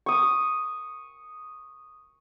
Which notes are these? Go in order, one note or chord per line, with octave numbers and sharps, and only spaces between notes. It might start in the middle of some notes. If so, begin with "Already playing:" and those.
C#6 D#6